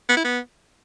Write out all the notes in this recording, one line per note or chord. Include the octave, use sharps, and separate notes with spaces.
B3
E4
B3